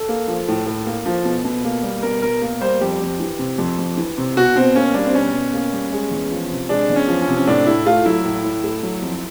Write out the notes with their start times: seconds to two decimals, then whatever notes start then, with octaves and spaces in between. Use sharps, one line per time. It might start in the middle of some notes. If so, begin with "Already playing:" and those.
Already playing: A4
0.09 A#3
0.28 F3
0.48 A2
0.67 A2
0.86 A#3
1.06 F3
1.25 B2
1.45 B2
1.64 A#3
1.83 G3
2.03 B2 A#4
2.22 B2 A#4
2.42 A#3
2.61 G3 C5
2.81 F2 G4
3.01 F2
3.20 E3
3.39 C3
3.58 F2
3.78 F2
3.97 E3
4.18 C3
4.37 B2 F#4
4.56 B2 C4
4.75 A#3 C#4
4.94 G3 D4
5.06 C4
5.14 B2 C#4
5.33 B2
5.53 A#3
5.72 G3
5.92 G#3
6.11 E2
6.30 F3
6.50 C3
6.69 G#3 D4
6.90 E2
6.96 C#4
7.08 F3
7.22 C#4
7.28 C3
7.37 C#4
7.47 A2 D4
7.67 A2 E4
7.86 A3 F4
8.06 F#3 E4
8.25 A2
8.44 A2
8.64 A3
8.83 F#3
9.02 F2